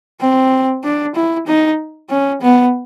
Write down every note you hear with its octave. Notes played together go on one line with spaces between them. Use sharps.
C4
D4
E4
D#4
C#4
B3